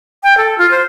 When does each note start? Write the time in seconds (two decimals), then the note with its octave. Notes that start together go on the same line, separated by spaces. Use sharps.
0.23 G5
0.37 A4
0.58 F4
0.71 C5